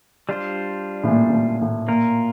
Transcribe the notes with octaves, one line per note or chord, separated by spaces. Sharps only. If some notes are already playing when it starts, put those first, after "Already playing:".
G3 D4 F4 C5
A2
A#2
A2
A#2
A2
A#2 A#3 F4 A#4